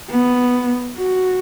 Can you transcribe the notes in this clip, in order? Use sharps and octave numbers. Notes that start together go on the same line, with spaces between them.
B3
F#4